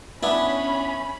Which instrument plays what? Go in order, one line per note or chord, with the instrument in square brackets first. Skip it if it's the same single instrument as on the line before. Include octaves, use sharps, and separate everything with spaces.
[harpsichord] B3 D4 E4 [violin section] C#4 B5